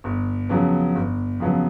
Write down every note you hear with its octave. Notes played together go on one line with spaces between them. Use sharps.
G1
F2 C#3 F#3 B3
G1
F2 C#3 F#3 B3